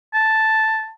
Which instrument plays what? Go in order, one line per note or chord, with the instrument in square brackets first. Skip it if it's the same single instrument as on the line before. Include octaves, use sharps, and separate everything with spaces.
[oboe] A5